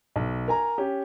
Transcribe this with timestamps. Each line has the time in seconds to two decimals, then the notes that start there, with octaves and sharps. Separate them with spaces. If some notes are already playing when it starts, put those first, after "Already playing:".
0.16 B1
0.48 A#4 G#5 A#5
0.78 C#4 G4